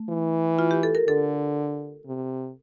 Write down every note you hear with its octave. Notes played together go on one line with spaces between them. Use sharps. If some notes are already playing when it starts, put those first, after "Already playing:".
Already playing: A3
E3
F4
G4
A4
A#4
D3 A4
C3